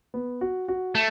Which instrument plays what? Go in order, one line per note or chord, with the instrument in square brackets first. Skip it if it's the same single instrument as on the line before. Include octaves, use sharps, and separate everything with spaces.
[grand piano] B3
F#4
F#4
[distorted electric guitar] A3